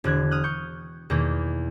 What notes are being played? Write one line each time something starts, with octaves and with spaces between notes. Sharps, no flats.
E1 D3 F#6 G#6
D#6 F6 F#6
C#6 G6
E2 B2 D#3 E3 A#3